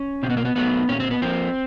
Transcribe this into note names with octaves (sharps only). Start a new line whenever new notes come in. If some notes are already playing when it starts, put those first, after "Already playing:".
Already playing: C#4
B2 C4
B3
A#3
B3
F#3 A3 B3
A#2 C#4
C4
B3
F3 A#3 C4